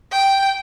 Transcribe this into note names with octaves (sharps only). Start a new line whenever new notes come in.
G5